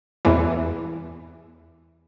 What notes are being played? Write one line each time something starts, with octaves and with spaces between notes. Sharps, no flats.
E2 E3